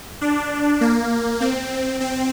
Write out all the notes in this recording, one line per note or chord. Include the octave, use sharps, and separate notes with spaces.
D4
A#3
C4
C4